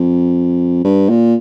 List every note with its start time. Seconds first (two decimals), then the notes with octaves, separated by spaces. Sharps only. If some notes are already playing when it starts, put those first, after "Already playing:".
Already playing: F2
0.84 G2
1.09 A#2